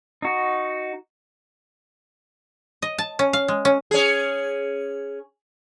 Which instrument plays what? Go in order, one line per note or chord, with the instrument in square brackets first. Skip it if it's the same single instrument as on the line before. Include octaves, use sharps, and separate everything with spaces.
[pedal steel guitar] D#4 F#4
[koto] D#5
A5
C#4
F5
G#3
C#4
[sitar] C#4 G#4